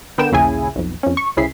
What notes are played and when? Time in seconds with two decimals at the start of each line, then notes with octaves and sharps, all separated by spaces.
0.18 D3 B3 A#4 G5 E7
0.31 A#1 D#2 C#3 E4 G#4 G#5
0.75 B1 F2
1.03 F2 C#4
1.17 C#6
1.37 C2 C#3 E4 G#4 B6 C7